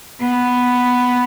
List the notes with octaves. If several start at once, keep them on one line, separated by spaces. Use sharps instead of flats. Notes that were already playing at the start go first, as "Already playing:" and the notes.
B3